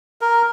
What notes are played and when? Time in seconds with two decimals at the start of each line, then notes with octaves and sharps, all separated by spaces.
0.21 A#4